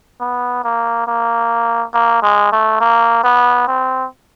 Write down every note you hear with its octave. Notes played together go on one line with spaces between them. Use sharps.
B3
A#3
A#3
A#3
G#3
A3
A#3
B3
C4